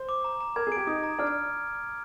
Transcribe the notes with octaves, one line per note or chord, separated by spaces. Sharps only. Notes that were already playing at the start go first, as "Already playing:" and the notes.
Already playing: C5
D6
A#5
A#5
A#4 G#6
G#4
G4 D7
D#4 D#6
A#5
D4 F6